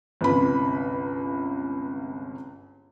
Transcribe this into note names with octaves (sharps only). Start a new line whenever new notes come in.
G1 C#2 C3 B5